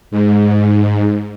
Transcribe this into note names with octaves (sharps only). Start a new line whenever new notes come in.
G#2